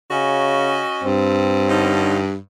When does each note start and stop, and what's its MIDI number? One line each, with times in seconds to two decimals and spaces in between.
0.11 0.82 49
0.11 1.05 61
0.11 1.05 66
0.11 1.05 75
1.03 2.37 43
1.03 1.97 60
1.68 2.17 50
1.68 2.17 61
1.68 2.17 63